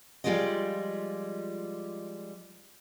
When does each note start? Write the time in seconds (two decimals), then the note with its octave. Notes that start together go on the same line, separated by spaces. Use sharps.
0.24 F3 G3 G#3 F4 D5 D#5